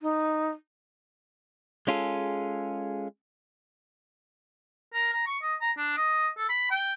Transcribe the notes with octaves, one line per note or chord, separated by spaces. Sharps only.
D#4
G#3 C#4 F4 G#4 A4
A#4
A#5
C#6
D#5
A#5
D4
D#5
A4
B5
G5